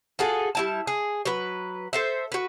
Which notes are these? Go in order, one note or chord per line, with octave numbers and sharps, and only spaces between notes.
F4 F#4 G#4 A4
G3 E4 A5
G#4
F#3 B4
A4 C5 E5
F#4 B4